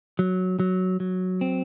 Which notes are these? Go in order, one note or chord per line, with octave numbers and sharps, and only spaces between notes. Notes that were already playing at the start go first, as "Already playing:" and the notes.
F#3
F#3
F#3
C4